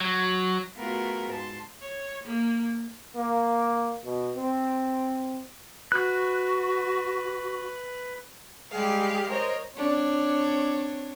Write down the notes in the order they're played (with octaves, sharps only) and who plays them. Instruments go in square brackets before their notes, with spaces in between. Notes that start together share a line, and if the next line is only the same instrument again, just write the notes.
[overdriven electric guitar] F#3
[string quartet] A3 B3 F4 F#4 G#4 A#4
G#2 A5 C6
[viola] C#5
A#3
[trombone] A#3
B2
C4
[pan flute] F#4 [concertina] B4 [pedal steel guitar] F#6
[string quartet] G3 G#3 G4 G#4 F5
A#4 C5 C#5 D#5
[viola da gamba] C4 D4 C#5